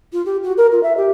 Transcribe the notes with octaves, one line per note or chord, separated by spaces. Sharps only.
F4
G4
F#4
A#4
F4
E5
G4